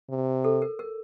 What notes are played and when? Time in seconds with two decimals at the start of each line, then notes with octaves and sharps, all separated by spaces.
0.10 C3
0.44 A4
0.62 A#4
0.79 A#4